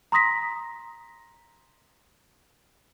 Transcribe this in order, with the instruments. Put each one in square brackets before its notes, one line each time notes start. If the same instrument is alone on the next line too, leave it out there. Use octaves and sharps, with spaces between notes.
[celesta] A#5 C6 D#6 A#6 B6